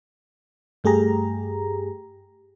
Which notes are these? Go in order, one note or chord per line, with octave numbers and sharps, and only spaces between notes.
G2 A3 G4 G#4 A#5